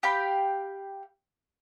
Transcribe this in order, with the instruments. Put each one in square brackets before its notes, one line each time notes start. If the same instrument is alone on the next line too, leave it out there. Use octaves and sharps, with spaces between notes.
[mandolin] G4 F5 G5 B5